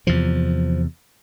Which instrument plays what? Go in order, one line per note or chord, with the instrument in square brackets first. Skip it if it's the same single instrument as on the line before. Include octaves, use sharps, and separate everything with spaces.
[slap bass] E2 C3 F3